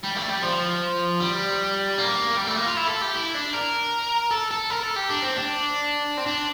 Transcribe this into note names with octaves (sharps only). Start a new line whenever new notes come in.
G3
A3
G3
F3
G3
A#3
G3
A3
A#3
F4
E4
A4
G4
E4
D4
A#4
A4
A4
A#4
A4
G4
D4
C4
D4
C4
D4